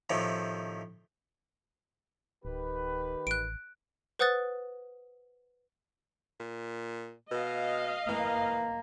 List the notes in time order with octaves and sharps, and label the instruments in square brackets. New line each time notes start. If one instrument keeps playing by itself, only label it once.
[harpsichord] A2 C3 D#3 F3
[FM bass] D1 [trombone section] D#3 G4 B4
[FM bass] A1 [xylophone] F#6 D7
[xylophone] B4 C5 F#5 D#6 F#6 A6
[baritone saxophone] A#2
[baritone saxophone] B2 [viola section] D#5 F5
[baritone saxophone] E3 [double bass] A#3